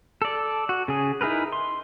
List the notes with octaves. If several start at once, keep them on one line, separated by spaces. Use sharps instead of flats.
A4 D5
F#4
C#3 G#4
D#4 E4 G#4 A#4 B4
C6